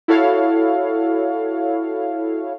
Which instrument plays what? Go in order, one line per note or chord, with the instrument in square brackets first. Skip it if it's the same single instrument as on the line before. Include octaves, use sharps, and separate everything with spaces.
[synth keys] E4 F#4 A4 C#5 F5